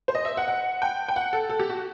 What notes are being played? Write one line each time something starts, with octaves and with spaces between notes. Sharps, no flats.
C5
D#5
E5
F#5
F#5
G5
G5
F#5
A4
A4
G4
F#4